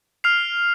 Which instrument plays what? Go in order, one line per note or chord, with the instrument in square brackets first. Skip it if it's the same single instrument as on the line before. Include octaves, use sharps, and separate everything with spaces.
[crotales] F6 C7 F7